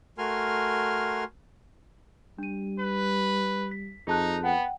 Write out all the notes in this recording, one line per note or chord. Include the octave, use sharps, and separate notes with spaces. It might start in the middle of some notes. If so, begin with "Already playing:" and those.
A3 F#4 A#4 G#5 C6 F6
G3 D4 D#7
B4
B6
F2 D#4 G#4 A5 F#6
B3 F#5 G5